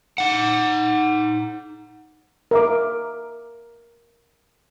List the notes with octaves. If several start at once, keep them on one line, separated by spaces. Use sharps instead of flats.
D#4 F#5
A#4 E5 D6